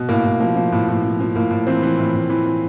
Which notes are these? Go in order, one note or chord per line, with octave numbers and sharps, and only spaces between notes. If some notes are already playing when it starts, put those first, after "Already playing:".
Already playing: B2
A2 A#3
A2
F3 A#3
F3
A2
A2
F3
F3
A2 A#3
A2
E3 C4
E3
A2
A2
E3
E3